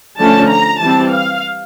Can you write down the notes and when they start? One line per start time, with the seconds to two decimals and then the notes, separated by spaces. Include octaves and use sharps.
0.19 D3 F3 A3 C#4 A5
0.50 A#5
0.81 E3 G3 C4 A5
1.13 F5